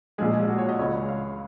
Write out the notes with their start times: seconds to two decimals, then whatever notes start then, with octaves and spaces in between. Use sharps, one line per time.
0.18 A#1 A#2 F3 G#3 G#4
0.33 G#4
0.49 F#4
0.58 C#5
0.69 D#5
0.79 C#2 C#3 G#3 C#5
1.09 F5